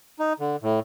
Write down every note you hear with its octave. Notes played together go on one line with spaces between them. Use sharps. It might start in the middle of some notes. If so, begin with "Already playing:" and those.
D#4
D3
A2